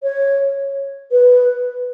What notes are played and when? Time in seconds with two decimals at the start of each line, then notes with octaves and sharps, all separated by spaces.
0.03 C#5
1.11 B4